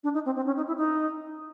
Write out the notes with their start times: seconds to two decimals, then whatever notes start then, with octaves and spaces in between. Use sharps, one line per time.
0.03 D4
0.14 D#4
0.25 C4
0.36 C4
0.46 C#4
0.57 D#4
0.67 E4
0.77 D#4